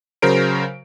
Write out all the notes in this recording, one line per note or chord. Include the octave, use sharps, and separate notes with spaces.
C#3 F#3 A#4 C5 D7